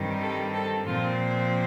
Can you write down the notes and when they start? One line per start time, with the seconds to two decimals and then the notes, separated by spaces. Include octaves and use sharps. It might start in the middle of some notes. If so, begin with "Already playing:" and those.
Already playing: G2 D#3 G3 C4
0.21 A4
0.53 A4
0.86 A#2 F3 C4 F4